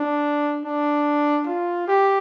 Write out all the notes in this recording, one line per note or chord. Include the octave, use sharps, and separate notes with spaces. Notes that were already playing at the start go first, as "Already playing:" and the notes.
Already playing: D4
D4
F4
G4